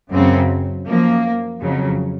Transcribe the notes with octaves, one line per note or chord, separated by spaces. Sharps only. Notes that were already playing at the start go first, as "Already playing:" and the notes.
F#2 C#3 F#3 C4
F#2 F3 A#3
F2 C#3 F#3